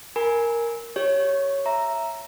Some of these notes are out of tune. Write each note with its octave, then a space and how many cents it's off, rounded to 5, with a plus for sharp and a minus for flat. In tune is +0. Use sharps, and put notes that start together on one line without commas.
A#4 +0 G#5 +0 B5 -20
G4 +0 C#5 +0
E5 +10 A#5 +0